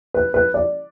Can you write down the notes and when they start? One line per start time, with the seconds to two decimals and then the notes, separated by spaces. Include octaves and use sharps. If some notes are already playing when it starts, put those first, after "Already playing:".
0.14 B4
0.34 B4
0.54 D5